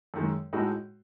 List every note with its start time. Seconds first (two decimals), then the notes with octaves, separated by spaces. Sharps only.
0.14 F#2 D#3 G#3
0.53 A2 G#3 D#4 F#4 A4